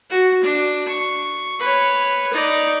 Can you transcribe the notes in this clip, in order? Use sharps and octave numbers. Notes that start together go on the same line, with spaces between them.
F#4
D4
C#6
B4 C#5
D#4 D5